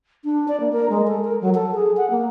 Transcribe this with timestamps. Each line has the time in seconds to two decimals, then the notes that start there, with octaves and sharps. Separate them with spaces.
0.24 D4
0.48 D5
0.60 A#3
0.72 A#4
0.90 G#3
1.07 A4
1.24 A#4
1.41 F#3
1.55 A4
1.75 G#4
1.97 F#5
2.10 A#3